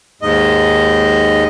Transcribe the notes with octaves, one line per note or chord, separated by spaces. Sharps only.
D#2 G#2 D#5